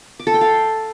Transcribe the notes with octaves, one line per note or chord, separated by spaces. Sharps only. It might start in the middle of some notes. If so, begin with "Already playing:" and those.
D6
A4
G5
F5